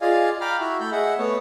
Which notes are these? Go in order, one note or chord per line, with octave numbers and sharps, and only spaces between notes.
F4 G#4 D5 D#5 F5 G#5
F5 G5 A#5 B5 D6 F6
E4 F#4 E5
A3 A4 B5 G6
G#4 D#5 E5 F#5
A3 B3 C#5